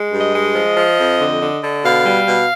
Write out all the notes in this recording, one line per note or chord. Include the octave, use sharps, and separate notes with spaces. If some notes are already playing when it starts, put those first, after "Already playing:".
Already playing: G#3
G2
D#5
G#3
F3
F3
F2
D3
D3
D3
B2 F5
G3
B2